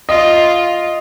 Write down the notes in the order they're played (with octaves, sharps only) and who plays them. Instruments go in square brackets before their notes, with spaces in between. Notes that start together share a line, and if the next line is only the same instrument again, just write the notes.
[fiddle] F4 [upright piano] D#5